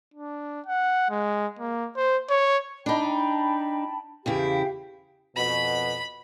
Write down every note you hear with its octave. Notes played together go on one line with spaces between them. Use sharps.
D4
F#5
G#3
A#3
C5
C#5
D4 D#4 G5 A5 B5
E2 C#3 E4 G4 F5 G5
F2 B2 B5